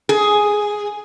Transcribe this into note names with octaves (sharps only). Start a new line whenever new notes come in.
G#4